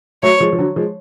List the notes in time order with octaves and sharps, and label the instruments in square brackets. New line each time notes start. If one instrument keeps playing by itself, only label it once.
[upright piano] F#3 A3 [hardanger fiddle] C#5
[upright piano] F3 G#3
F3
D3 F#3
F3 G#3